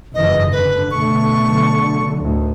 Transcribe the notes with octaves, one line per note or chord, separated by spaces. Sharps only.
F#1 F2 G#2 E3 D#5
D3 B4
B2 A3 C#6
D3 F#3
D2 A2 D#3